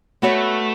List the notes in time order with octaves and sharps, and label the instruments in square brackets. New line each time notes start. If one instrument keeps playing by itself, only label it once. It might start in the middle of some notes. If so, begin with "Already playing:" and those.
[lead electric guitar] A3 [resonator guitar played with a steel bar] B3 F#4 C#5